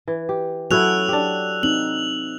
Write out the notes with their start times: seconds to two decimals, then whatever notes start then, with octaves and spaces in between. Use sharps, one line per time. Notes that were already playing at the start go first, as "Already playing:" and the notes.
0.08 E3
0.29 G4
0.71 F#3 C#4 E4 F#4 A4 E6 F#6 F7
1.09 D4 G4
1.63 C4 D#4 F#7